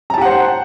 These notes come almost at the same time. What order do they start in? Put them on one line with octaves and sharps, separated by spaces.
A#5 A5 G4 F#5 C5